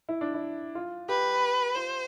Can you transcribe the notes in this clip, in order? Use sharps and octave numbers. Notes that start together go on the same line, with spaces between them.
E4
D4
E4
F4
G4 B4
F4 C5